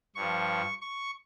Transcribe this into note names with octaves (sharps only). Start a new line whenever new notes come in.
G2 F3 C#6
C#6